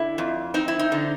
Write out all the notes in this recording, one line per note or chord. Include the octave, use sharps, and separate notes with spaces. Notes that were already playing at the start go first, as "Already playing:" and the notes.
Already playing: D3 E4
F2
C4 D#4
E4
D#4
D3